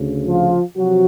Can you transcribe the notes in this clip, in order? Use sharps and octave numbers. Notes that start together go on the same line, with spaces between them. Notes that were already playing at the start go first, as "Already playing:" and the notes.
Already playing: D2 C#3
F3 F4
C3 F3 F#3 F#4